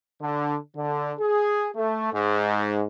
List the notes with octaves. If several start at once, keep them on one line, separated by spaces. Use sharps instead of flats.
D3
D3
G#4
A3
G#2